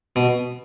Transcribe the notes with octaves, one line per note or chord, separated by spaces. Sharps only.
B2